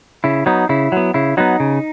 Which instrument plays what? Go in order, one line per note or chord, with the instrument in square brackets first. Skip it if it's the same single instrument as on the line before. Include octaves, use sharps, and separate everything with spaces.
[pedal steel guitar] C#3 E4
F#3 B3 D#4
C#3 E4
F#3 B3
C#3 E4
F#3 B3 D#4
C#3